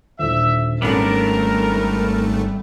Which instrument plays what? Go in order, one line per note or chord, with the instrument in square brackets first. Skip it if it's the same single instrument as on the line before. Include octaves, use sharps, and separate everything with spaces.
[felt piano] D#1 D3 [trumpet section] E5
[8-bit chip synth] G#1 A3 [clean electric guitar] G3 B3 D4 [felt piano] C#4 [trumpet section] A#4